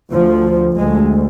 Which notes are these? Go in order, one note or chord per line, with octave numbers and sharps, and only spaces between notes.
D2 F3
D2 G#3